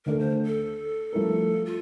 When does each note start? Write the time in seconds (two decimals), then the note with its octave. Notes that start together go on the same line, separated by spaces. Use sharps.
0.06 D2 D3 A3 D4 A4 A#4
0.19 C5
0.46 A4
1.13 G2 F3 A3 E4 A#4
1.66 F4